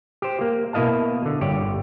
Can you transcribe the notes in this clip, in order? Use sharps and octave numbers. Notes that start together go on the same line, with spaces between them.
G4 C5
A#3
B2 A#3 E4 D#5 F5 A5
D3
G1 G4 C#5 D5